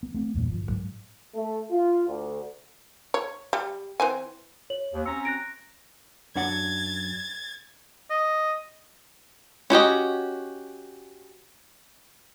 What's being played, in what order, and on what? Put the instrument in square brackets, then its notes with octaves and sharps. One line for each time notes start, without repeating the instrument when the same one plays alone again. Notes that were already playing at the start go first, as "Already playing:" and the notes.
[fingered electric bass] B3
A3 C4
E2 G2 A#2
G1 F3
G#2 F#3 G#3
[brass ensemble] A3
F4
D2
[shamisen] C#5
G3
E3 C4 G#5
[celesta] C#5 F#7
[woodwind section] D#2
[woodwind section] C4 C#4 A#5 [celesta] E6 C#7
[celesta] F#6 A#6 D7
[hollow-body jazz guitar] F#2 D4 F#5 [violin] G#6 A6
[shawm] D#5
[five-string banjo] C#4 F#4 G4 D#5